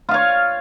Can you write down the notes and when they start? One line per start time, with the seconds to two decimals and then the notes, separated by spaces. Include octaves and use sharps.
0.09 F4
0.11 F5
0.14 C#5